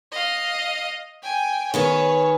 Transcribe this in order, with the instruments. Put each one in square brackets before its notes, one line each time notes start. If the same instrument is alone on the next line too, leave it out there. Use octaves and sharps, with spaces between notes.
[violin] D#5 F5
G5 G#5
[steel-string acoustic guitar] D#3 B3 G#4 [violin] C#5